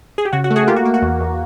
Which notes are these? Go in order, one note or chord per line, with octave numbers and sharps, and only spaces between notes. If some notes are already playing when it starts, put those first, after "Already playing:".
G#4
G4
C#3 F#4
F#4
A3
F#4 G#4
A#3 F4 G4
F#4
A#3
F#4
E2
E2